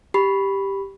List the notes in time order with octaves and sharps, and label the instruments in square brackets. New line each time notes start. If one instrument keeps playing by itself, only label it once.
[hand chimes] G4 B5